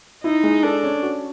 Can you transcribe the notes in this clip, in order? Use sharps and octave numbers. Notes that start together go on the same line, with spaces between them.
D#4 E4
G#3
D4 A4
C#4
F#4